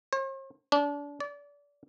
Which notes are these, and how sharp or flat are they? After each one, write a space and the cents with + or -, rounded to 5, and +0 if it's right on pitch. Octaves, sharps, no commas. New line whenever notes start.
C5 +45
D4 -30
D5 -30